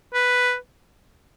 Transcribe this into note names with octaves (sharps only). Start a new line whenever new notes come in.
B4